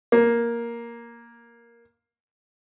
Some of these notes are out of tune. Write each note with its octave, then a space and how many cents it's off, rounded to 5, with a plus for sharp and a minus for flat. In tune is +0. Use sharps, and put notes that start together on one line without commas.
A#3 +5